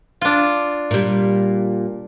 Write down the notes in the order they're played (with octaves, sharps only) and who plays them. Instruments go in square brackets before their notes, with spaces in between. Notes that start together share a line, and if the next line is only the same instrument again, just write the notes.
[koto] D4 F4
[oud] A#2 G3